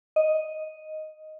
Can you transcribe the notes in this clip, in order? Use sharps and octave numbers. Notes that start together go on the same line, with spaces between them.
D#5